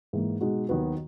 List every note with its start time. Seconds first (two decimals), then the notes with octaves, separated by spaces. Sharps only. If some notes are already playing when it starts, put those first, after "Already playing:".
0.13 G#2 E3 A#3
0.41 B2 G#3 D#4 F#4
0.69 D#2 D#3 F#3 B3 F#4